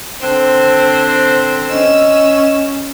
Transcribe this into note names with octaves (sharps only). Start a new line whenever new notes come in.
D3 C4 C5
C#4 D#5 E6